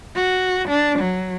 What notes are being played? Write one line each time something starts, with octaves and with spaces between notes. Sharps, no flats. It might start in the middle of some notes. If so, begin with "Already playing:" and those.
F#4
D4
F#3